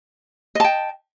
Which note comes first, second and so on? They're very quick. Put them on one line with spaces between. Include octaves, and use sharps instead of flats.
D#5 A5 G5